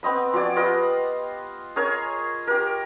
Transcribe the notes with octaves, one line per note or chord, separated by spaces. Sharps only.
B3 C4 D#5 B5
F3 F#4 D5 G#5
F4 G4 B4 D#5
G#4 A#4 C#5 G#5
G4 A#4